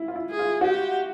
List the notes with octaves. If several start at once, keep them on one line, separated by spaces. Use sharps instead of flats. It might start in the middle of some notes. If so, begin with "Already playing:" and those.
Already playing: E4
F4
E4
G#4
F4
F#4 G4